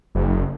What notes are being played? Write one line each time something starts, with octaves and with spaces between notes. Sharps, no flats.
F#1